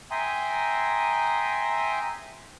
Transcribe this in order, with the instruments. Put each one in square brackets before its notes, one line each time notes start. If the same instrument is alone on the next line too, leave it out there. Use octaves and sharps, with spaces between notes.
[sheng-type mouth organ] E5 G5 G#5 A#5 C6 D#6